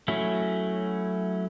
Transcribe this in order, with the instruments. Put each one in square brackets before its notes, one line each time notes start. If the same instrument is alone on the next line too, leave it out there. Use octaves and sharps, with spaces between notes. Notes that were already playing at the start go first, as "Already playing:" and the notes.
[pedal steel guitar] F#3 A3 C#4 E4 F#4